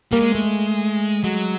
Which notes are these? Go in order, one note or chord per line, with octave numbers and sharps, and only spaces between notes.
G3 A#3
G#3
A3
F#3 G#3